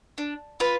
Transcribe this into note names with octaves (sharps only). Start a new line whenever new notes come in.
D4
F4 B4